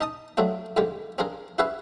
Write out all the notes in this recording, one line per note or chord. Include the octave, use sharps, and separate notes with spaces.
D#4 D#5 A5 D#6
F#3 A3 C4 D4 F4
F2 D3 D#3 G#3 F4 G4
C4 D4 F4 G#4 A#4
E4 F#4 G#4 B4 E5 F5